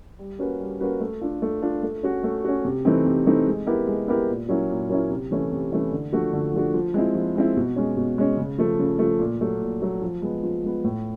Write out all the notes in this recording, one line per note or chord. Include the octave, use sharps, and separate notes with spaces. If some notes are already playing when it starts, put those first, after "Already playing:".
G3
A#3 C#4 F#4 B4
G3
A#3 C#4 F#4 B4
A3
D4 F4 A4
A3
D4 F4 A4
A3
C#4 F#4
A3
C#4 F#4
C3
E3 A3 C4 D#4
C3
E3 A3 C4 D#4
G#3
B3 E4 G4 A#4
G#3
B3 E4 G4 A#4
A#2
F#3 A#3 C#4 E4
A#2
F#3 A#3 C#4 E4
C3
E3 A3 C#4 E4
C3
E3 A3 C#4 E4
D3
F3 A3 D4 F#4
D3
F3 A3 D4 F#4
F3
G#3 C4 E4
F3
G#3 C4 E4
B2
G#3 C#4
B2
G#3 C#4
C#3
F3 A3
C#3
F3 A3
A#2
F#3 A3
A#2
F#3 A3
F3
G#3 B3
F3
G#3 B3
A2